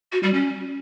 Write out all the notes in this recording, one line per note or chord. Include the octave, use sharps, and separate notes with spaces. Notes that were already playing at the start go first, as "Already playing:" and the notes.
F#4
G3
C#4